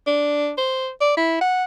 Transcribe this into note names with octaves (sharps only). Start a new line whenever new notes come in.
D4
C5
D5
E4
F#5